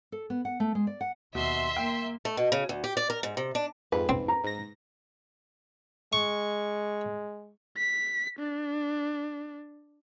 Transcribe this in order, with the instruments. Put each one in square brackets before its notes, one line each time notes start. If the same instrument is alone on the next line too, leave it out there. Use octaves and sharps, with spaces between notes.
[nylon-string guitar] A4
B3
F#5
A3
G#3
D5
F#5
[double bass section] D#2 [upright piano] B2 [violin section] E5 C6
[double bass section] A#3 [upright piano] G5
[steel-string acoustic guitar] A3
B2
C#3
D2
G4
D5
A#4
G#2
C3
D4
[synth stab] F2 G#2 [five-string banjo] B4
[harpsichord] C4
[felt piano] A#5
[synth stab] G#2 A#6
[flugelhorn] G#3 [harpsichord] C#6
[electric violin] B6
D4